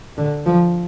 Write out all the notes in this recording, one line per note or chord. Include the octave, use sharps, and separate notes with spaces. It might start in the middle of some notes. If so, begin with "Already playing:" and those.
D3
F3